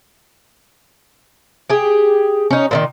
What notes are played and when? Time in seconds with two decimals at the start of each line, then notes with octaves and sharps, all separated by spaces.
1.69 G4 G#4
2.50 C#4 D#4
2.71 A#2 D3 D#3